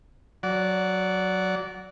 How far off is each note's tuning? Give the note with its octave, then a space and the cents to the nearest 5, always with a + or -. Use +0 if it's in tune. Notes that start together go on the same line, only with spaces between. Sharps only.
F#3 +0 D5 -25 F#5 +0